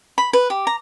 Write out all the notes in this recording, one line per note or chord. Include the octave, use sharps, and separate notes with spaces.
B5
B4
G4
A#5